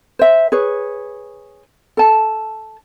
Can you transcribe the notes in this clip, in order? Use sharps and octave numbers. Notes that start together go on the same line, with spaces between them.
C5 E5
G#4 B4 C#5
A4 A5